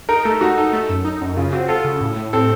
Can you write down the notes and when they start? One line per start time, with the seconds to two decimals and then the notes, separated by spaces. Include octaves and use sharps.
0.09 D#4 A#4
0.25 A3 A4
0.41 D#4 F#4
0.57 D#4 A4
0.73 A3
0.89 F#2
1.05 D#4
1.21 F#2
1.37 C#3 F4
1.53 C4 F#4
1.68 F4 A4
1.84 C#3
2.01 A2
2.16 A2
2.33 C4 A4